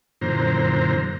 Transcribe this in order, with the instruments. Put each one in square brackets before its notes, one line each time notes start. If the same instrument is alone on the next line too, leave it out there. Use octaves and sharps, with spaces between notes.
[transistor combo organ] F#2 A#2 D3 E3 C5 A#5